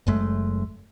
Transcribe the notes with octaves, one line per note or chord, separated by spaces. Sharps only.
F#1 F#2 G#3 A3